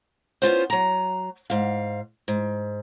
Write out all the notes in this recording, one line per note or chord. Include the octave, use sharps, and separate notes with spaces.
B3 C#4 F4 C5
F#3 A#5
G#2 F5
G#2